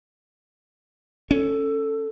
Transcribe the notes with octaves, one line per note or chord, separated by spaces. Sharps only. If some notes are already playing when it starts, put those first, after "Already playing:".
C#4 A4